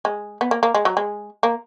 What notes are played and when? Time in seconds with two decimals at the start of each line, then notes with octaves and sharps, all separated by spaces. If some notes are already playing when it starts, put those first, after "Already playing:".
0.05 G#3
0.41 B3
0.51 A#3
0.63 A#3
0.74 G#3
0.85 F#3
0.97 G#3
1.43 A#3